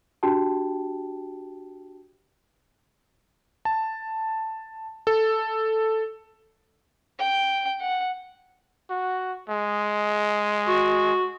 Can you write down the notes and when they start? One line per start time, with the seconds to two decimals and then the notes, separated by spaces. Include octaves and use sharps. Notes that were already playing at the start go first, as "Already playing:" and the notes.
0.23 D4 F#4 G4 G5 A5
3.65 A5
5.07 A4
7.19 G5
7.80 F#5
8.90 F#4
9.50 G#3
10.68 F#4